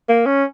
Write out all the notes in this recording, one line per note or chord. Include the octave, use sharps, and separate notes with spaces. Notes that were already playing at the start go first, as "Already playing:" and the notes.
A#3
C#4